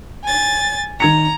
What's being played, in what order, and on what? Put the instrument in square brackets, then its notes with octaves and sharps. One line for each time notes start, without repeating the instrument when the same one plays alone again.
[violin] G#5 A6
[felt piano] D#3 G#6 C#7 [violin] A#5